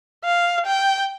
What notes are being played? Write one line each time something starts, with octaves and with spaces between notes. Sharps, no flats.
F5
G5